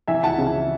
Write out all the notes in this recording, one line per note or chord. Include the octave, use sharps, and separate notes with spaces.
E3 E5 G#5
C#2 F#5 A5
C#3